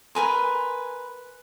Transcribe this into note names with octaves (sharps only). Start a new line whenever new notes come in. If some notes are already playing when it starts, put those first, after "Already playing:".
A#4 B4 G#5 C6